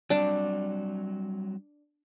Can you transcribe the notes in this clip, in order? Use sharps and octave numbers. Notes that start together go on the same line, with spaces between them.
F#3 G3 C4 D4